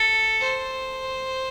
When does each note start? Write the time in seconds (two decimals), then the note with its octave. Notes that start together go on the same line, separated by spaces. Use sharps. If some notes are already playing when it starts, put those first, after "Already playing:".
Already playing: A4
0.40 C5